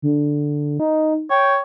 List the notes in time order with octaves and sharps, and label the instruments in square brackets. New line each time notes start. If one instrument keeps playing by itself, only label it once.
[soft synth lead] D3
D#4
[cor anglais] C#5 [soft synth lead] G5